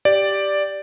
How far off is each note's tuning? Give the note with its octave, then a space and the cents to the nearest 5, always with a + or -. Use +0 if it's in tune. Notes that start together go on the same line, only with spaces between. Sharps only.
G4 +0 D5 +0